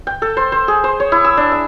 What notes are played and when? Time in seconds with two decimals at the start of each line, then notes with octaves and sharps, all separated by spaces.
0.07 G5
0.22 A4
0.37 C5
0.52 C5
0.68 G#4
0.84 C5
1.00 C#5
1.12 E4
1.25 E6
1.37 D4
1.52 E5